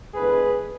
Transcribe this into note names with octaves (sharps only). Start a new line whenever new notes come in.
E2 D3 G#3 G#4 B4